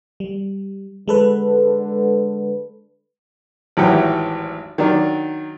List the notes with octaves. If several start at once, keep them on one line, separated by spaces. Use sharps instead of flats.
G3
D3 G#3 A4 B4
G#1 A2 E3 F#3 G4 F#5
D#3 F#3 D4